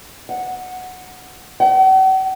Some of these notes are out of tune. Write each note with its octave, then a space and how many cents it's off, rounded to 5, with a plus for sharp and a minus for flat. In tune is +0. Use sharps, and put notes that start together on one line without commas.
F#5 -5
F#5 +45